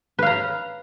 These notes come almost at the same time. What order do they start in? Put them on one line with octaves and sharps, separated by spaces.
B4 F5 A#5